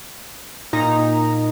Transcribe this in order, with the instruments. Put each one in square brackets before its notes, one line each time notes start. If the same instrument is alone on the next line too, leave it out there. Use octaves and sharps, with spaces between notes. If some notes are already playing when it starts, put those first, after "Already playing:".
[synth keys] A#2 D#4 A#5